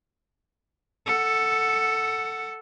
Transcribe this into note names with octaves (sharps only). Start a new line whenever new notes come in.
A4 F#5